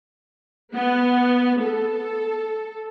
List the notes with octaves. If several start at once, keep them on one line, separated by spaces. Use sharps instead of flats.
B3
A4